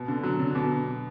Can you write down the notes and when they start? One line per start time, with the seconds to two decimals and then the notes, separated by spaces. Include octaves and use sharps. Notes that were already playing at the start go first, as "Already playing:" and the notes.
Already playing: B2
0.08 D3
0.23 F#3
0.40 D3
0.55 B2